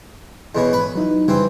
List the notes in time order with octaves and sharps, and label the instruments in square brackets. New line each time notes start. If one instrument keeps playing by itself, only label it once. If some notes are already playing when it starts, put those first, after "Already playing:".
[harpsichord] E2 B2 C#4
[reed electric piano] G#2 E3 [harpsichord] B4
[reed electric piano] F#3 D#4 E4
[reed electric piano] F#2 C#3 G3 [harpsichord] E3 C4